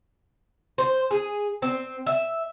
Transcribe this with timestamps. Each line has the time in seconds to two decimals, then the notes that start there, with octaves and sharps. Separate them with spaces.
0.78 C5
1.11 G#4
1.62 C4
2.06 E5